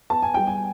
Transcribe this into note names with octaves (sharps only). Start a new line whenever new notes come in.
B3 A5
G#5
G3 G5
G#5